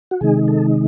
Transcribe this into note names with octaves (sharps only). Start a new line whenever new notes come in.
F#4
C3 D#3 G#3 D#4 G#4
A4